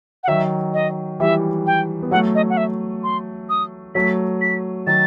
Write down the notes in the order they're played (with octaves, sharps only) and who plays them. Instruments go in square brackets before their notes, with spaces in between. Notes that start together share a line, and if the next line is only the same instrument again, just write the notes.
[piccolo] F#5
[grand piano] D#3 F#3 [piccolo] E5
[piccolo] D#5
[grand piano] E3 G3 [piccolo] E5
[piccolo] G5
[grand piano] B3
[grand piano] F#3 A3 [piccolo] F#5
[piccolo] D#5
F#5
E5
C6
D#6
[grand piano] F#3 A3 [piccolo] B6
[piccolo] B6
[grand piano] D#3 F#3 [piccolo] A6